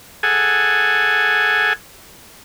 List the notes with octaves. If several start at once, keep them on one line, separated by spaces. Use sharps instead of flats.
G#4 A4 F#5 G#5